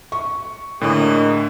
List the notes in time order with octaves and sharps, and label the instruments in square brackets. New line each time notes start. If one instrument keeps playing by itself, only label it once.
[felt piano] C#6
[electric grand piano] A2 D3 [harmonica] A#3 G#4 D#5